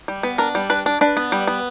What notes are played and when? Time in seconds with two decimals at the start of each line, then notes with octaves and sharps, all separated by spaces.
0.08 G3
0.23 B3
0.38 D4 A#4
0.55 G3
0.70 D4 B4
0.86 D4
1.01 D4 B4
1.17 B3
1.32 G3
1.47 B3